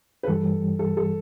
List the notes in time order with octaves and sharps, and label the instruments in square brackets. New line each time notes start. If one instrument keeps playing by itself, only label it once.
[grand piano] B4
[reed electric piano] G2 E3 G3 [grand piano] A4
[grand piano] A4
A4